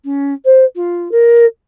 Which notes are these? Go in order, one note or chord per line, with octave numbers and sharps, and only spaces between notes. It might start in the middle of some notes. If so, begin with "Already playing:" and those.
C#4
C5
F4
A#4